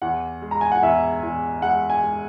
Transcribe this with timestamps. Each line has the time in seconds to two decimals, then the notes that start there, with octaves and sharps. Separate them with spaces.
0.02 E2 F#5
0.42 G#3
0.51 A#5
0.61 G#5
0.72 F#5
0.82 E2 E5
1.23 E2
1.62 G#3 F#5
1.90 G#5
2.03 G#3